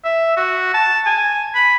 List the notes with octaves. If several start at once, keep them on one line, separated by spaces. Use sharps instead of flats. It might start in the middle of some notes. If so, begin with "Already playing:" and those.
E5
F#4
A5
G#5
B5